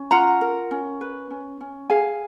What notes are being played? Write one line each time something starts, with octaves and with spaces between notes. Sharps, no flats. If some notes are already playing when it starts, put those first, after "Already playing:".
Already playing: C#4
F4 F#5 A#5
A#4
C#4
B4
C#4
C#4
G#4 F5 G#5